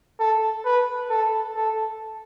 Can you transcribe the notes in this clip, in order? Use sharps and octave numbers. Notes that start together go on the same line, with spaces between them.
A4
B4
A4
A4